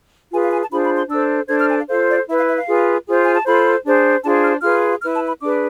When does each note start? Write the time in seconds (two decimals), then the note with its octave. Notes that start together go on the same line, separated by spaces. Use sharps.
0.31 F4 G#4 B4 G#5
0.41 F5
0.51 G#5
0.61 A5
0.71 D4 F4 G#4 C5 B5
0.84 B5
0.96 C6
1.09 D4 A4 C5 E6
1.49 D4 A4 C5 G#6
1.59 F6
1.68 G#5
1.78 F5
1.88 F4 A4 C5 F5
2.08 D5
2.27 E4 E5
2.32 B4
2.37 F5
2.47 E5
2.56 F5
2.66 F4 G#4 B4
3.06 F4 G#4 C5
3.23 G#5
3.34 A5
3.45 F4 A4 C5 B5
3.84 D4 G#4 C5
4.23 D4 F4 G#4 C5 A5
4.43 F6
4.62 F4 G#4 B4 F6
5.02 E4 B4 F6
5.15 A5
5.27 B5
5.41 D4 G#4 B4 D6